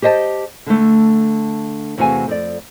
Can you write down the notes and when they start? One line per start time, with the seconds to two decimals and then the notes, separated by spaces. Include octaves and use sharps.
0.02 G4 C5 D#5 F5 A5
0.66 D3 A3
1.98 E2 C3 A3 F#4 F5 G#5
2.28 F2 D5